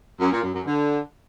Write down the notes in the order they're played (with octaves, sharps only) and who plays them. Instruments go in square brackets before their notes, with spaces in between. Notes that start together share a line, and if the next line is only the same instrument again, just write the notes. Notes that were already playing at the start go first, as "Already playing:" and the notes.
[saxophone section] F#2
A#2
F#2
F#2
D3